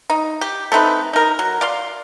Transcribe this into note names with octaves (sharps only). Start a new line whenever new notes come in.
D#4
G4
A3 C4 D#4 B4
D#4 A#4
F#3
D5 F5 C6